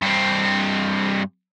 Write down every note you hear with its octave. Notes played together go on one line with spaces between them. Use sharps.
G2 C4